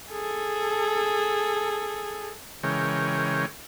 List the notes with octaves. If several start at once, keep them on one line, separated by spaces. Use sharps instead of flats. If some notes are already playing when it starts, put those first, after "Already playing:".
G#4 A4
C#3 E3 G#3 A#4 C#5 G5